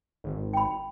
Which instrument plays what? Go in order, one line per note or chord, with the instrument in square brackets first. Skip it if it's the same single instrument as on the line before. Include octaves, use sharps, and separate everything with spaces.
[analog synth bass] G#1
[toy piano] G5 B5